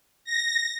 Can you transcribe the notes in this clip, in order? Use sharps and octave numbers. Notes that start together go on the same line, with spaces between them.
A#6